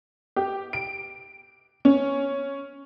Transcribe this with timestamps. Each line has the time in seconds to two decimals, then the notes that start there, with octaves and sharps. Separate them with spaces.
0.36 G4
0.73 D7
1.85 C#4